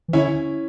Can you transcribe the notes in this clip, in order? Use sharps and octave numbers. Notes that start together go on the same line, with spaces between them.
E3
D3 C#4 E4